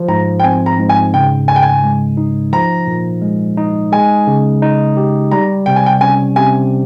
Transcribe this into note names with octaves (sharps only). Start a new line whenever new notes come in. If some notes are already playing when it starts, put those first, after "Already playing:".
Already playing: F3
G#2 A#5
G5
C4 G#5
A#5
G#2
G#5
C#3 G5
C#2 G#5
G5
G#5
G#3
D#4
F3 A#5
A#2
G#3
D#4
G#3 G#5
C#3
D#4
G4
G3 A#5
C3 G5
G#5
G5
C#4 G#5
C3 G#5